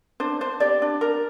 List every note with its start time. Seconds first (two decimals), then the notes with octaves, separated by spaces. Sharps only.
0.20 D4 C5
0.41 D4 C5
0.60 G4 D5
0.82 D4
1.01 A#4